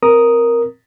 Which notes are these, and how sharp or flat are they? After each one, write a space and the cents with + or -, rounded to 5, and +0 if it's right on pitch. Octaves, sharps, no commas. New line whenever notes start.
C4 +0 A#4 +5 D#6 +0